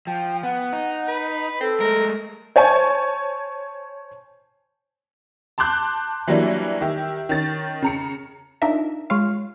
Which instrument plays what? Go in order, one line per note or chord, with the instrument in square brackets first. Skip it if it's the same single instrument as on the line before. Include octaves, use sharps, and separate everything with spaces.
[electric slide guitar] F3 [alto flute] G5
[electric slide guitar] B3 [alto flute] F#5
[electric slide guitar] D#4
[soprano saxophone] B4
[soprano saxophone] C4 [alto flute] A4
[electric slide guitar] G#3 A3 [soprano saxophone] A#4
[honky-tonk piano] C5 C#5 G#5 A5
A5 C6 D6 F#6 G6
E3 F#3 G3 A#3 D4 E4
D#3 G4 E5
D#3 C#4 A6
C#3 A#5 C#7
[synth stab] D4 D#4 F4 A#4 E5
G#3 F4 C#5 F5